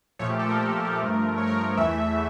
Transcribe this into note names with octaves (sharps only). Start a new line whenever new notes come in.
A#2 F3 A3 C#5
G4
A4
A#4
G2 F3 A3
C#5
A#4
A#4
A#4
E2 E3 A3 E5